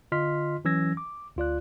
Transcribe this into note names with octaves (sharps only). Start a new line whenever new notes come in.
D3 F4 D#5 C6 F6 B6
E3 F#3 C#4 E6 G#6 A#6
D6
D2 F4 D5 F#6